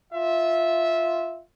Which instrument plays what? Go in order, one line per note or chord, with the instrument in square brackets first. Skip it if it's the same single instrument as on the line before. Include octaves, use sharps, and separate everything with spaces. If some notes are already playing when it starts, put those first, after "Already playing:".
[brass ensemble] F4 E5